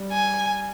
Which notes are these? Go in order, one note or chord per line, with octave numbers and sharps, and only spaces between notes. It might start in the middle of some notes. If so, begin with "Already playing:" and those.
Already playing: G3
G#5